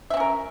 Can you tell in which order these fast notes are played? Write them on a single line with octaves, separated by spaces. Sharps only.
E5 C4 C#4 A#4